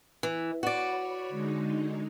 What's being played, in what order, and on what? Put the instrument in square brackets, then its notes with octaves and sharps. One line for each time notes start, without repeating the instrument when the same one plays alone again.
[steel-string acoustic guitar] E3
[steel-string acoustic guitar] F#4 D5 [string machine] C#5 B5
[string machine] C#5 B5
D3 G#3 D#4